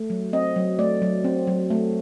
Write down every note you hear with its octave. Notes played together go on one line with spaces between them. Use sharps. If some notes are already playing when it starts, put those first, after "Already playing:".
Already playing: A3
F#3
C4 D#5
F#3
A3 D5
F#3
C4
F#3
A3